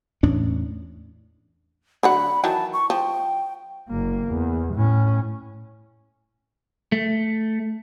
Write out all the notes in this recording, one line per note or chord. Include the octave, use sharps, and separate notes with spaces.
E2 A2 C#4 D4
D3 F#3 F#5 B5
D#3 E3 F#3 A5
C#6
F3 G5
F#1 A#3
E2
A2 C#4
A3